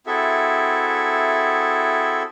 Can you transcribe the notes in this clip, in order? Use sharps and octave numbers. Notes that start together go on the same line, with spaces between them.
C4 E4 F#4 G#4 A4 E5